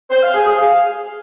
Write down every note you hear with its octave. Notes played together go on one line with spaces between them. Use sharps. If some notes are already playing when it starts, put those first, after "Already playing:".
C5
F5
G#4
G#4
F5